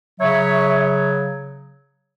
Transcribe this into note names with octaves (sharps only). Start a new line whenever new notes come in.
C#3 F#3 C#5 E5